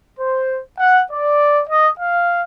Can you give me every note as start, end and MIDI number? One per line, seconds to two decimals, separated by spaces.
0.18 0.60 72
0.79 1.01 78
1.10 1.61 74
1.68 1.89 75
1.99 2.42 77